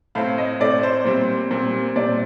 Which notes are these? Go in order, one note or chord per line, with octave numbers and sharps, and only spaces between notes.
A2 A3 C4 F5
D#5
A2 A3 C4 D5
C5
A#2 G3 C4
A#2 G3 C4
A#2 G3 C4 D5